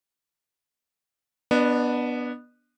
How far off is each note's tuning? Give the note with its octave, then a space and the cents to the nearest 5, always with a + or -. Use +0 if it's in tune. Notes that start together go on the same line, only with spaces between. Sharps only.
B3 -10 D4 +0 D#5 -40